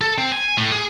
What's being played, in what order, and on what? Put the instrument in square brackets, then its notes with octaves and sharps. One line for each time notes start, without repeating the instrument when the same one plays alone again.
[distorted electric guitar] A4
C4
G#5
A2
G#4